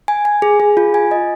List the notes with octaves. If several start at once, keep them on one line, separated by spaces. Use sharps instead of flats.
G#5
G#5
G#4
G#4
F4
G#5
D#5